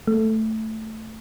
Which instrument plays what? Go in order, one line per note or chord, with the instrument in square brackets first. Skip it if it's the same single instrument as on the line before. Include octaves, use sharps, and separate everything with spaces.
[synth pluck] A3